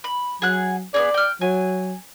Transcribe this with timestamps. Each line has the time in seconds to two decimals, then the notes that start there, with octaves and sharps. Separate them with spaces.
0.04 B5
0.42 F#3 G#4 F#5 F#6
0.94 B3 C4 G#4 D5
1.14 G5 F6
1.41 F#3 G#5